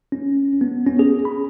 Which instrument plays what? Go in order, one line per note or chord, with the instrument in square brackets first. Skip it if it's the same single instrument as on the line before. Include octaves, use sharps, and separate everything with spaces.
[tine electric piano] C#4
B3
C#4
G#4
B5